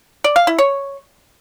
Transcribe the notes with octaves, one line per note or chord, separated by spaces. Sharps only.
D5
F5
E4
C#5